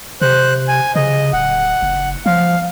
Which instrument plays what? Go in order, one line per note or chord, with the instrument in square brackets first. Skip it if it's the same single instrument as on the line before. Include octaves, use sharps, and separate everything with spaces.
[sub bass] C3 [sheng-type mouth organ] C5 F#6
[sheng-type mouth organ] G#5
[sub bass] C#3 [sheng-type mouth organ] D#5
[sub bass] D1 [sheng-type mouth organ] F#5
[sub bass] F#1
[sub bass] F3 [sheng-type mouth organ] F5